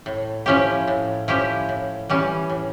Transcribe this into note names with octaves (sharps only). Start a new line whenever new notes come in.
A2
F3 C#4 E4 G4
A2
F3 C#4 E4 G4
A2
E3 G3 C#4
A2